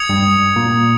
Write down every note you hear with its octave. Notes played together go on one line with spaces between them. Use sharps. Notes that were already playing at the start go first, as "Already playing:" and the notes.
Already playing: D#6 G#6 C#7 F7
G2
A#2